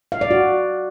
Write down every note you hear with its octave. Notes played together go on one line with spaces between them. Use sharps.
F5
D5
F#4